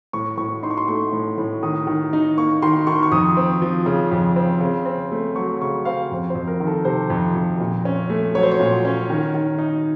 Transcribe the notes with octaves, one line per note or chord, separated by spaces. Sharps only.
A2 C#6
A2 C#6
D#4 C6
C#6
C6
A3 C#6
A2
A2
D#3 D#6
D#3
D#4
A#3 C#6
D#3 C6
D#3 C#6
C6
C#6
F2 D#6
C4
F3
C#3
F2
C4
C#3
C4
A3
F#3 C#6
C#3 C#6
C4 F5
F2
C5
F2
A#4
D#3
A4
C3 C5
F2
F2
A#2
C#4
A3
F#3 C#5
C5
C#5
A#2
C#4
D#3
D#3
D#4